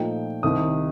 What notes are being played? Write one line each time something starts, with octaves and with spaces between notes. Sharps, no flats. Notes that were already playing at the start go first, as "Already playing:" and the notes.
Already playing: A#2 F3 A3 D#4 G5
C2 C3 D#3 D#6